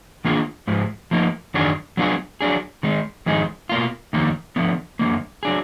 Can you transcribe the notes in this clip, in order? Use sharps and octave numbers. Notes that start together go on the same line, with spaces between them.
D#3 A#3 D4 F4 G#4
G#2 F3 G#3
F3 A#3 D#4
F#2 D#3 F#3 D4 G#4
F#3 B3 D4 F4 G#4
F#3 D4 G#4
D#3 G#3 D#4
F2 D#3 G#3 D#4 G#4
B2 A#3 F4
F2 D#3 A#3 D#4
D3 F3 B3
F#2 D3 F3 A#3
F#3 D4 G#4